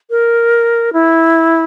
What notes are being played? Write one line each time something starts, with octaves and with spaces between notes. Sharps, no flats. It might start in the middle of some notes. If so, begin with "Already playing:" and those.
A#4
E4